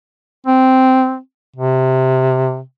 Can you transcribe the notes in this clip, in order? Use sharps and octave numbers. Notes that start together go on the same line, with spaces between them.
C4
C3